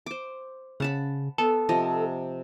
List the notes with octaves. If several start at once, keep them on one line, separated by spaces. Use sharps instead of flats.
C5 D6
C#3 F#5 A5 B5
B3 A4
C3 F3 D#5